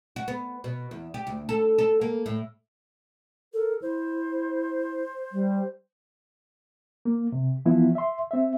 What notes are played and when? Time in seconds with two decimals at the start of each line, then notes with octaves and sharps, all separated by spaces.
0.16 F#4
0.28 B3
0.64 B2
0.91 E2
1.14 G4
1.27 D2
1.49 A4
1.78 A4
2.01 A#3
2.26 A2
3.53 A4 A#4
3.82 E4 C5
5.32 G3
7.05 A#3
7.32 C3
7.65 E3 F3 B3 E4 F4
7.95 E5 C6
8.31 C4 E5